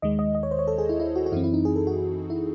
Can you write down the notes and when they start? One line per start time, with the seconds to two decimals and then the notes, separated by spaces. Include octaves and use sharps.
0.02 D#2 D#3 G#3 D#5
0.19 D#5
0.35 D#5
0.43 C#5
0.51 C5
0.59 C#5
0.67 A4
0.78 G#4
0.89 E4
1.00 E4
1.16 F#4
1.26 F#4
1.32 F#2 E3 C4 E4
1.44 E4
1.54 D#4
1.65 G#4
1.76 A4
1.87 F#4
2.30 E4